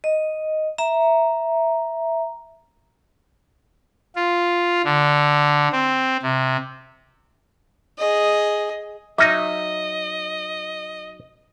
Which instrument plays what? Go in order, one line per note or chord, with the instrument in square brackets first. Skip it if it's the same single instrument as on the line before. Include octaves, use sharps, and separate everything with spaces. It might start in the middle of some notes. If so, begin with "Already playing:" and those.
[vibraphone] D#5
E5 A#5
[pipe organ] F4
D3
C4
C3
[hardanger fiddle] G#4 D#5
[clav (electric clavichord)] F#3 D#4 [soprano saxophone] D#5 [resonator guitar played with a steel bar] E5 [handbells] D6 F6 A#6